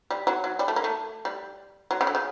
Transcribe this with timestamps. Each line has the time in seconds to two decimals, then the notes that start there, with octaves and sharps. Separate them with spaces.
0.10 G3
0.27 F#3
0.44 F#3
0.59 G3
0.68 A3
0.76 A#3
0.84 A3
1.25 G3
1.91 F#3
2.01 C#3
2.07 D3
2.15 C#3